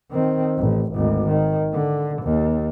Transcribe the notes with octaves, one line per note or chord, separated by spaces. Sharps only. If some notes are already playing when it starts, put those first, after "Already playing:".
D#3 C4
A1
G#1 D2
D#3
D3
D#2